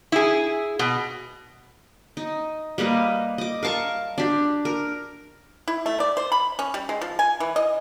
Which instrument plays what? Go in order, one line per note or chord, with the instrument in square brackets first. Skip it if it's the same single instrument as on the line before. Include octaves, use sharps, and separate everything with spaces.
[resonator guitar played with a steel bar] E4 G#4
B2
[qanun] D#4
G3 A#3 B4 D#5
D#5 D6
A#4 F5 A5 C#6
D4 G4
A#4
[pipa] E4
A3
D5
C5
B5
C#4
G3
G#3
F3
G#5
E3
D#5